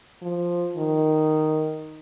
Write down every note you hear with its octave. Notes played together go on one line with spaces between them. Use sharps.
F3
D#3